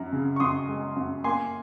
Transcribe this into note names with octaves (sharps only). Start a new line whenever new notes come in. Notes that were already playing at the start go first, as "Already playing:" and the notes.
Already playing: F#2 A#5
C#3
C#6
F#2 C6 D#6
G#3
F#2
A#3 G#5 C6